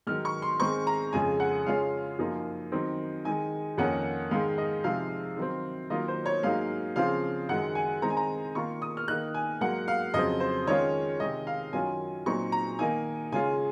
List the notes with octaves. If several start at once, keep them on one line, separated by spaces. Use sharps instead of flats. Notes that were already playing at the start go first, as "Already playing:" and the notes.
G#2 D#3 F#3 F6
C#6
C6
G#2 D#3 G#3 C4 C#6
A#5
F2 C#3 G#3 G#5
F#5
C#3 G#3 C#4 F4 F5
F#2 F3 A#3 D#4
D#3 F#3 C4 D#4
D#3 G#3 D#4 G#5
F2 D#3 A#3 C#4 F#5
G#2 D#3 G#3 F5
D#5
C3 F3 G#3 D#4 F5
D#3 F#3 C4
D#3 F#3 A#3 F4 D#5
C5
C#5
G#2 F#3 A#3 D#4 F5
C#3 F3 C4 F4 F5
F#2 D#3 G#3 F#5
G#5
D#3 G#3 C4 D#4 A#5
G#5
A#5
D#3 A#3 F4 C#6
D#6
F6
D#3 A#3 D#4 F#6
G#5
G#2 F#3 A#3 F#5
F5
F2 C#3 F#3 C4 D#5
C5
D#3 G#3 C#4 F4 C#5
C3 D#3 G#3 D#5
F5
F#2 D#3 F#3 C#4 F4 G#5
A#2 F#3 C4 D#4 C#6
A#5
D#3 A#3 D#4 G#5
C#3 G#3 C#4 F4 G#5